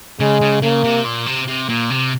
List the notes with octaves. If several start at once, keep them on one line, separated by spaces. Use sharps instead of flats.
C#3 G#3
C#3
C#3 A#3
C3
A#2
C3
C3
A#2
C3